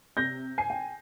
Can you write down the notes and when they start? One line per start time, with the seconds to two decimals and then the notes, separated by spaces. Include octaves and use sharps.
0.17 C3 G6 A#6
0.58 G#5 C7
0.70 G5